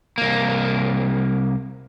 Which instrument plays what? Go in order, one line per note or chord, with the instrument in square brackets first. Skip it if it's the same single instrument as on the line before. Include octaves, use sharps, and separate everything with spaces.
[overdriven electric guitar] C2 A#3